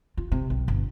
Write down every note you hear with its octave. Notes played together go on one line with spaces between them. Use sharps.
F4
C3
B1
G1